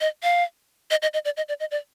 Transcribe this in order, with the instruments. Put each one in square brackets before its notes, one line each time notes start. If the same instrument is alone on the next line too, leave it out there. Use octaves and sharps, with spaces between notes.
[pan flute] D#5
F5
D#5
D#5
D#5
D5
D#5
D5
D#5
D5